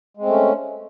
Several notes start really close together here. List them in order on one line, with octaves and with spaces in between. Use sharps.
G#3 C4 A3 C#4